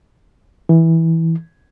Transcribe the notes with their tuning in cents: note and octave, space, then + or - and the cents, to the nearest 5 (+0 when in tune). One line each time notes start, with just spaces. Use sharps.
E3 -10